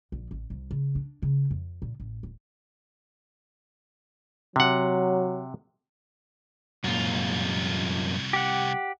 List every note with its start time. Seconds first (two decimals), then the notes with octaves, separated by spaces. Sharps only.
0.12 A#1
0.31 A1
0.50 C2
0.71 C#3
0.95 D4
1.22 C#3
1.51 F2
1.82 A#2
2.00 A1
2.23 D1
4.56 C3 F#3 F#5
6.84 C2 F#2 A#2 F4
8.33 G4 F#5